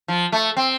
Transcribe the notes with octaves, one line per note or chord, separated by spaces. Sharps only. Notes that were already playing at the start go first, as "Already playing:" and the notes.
F3
A3
C4